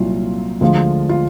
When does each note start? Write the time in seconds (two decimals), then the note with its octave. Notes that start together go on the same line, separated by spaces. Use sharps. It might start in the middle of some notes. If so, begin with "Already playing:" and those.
Already playing: C2 A#2 F#3 F4
0.61 D2 D3 F3 G#3
1.09 F4